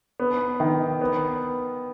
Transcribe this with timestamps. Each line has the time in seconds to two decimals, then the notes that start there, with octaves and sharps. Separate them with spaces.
0.20 B3
0.60 D#3
1.01 B3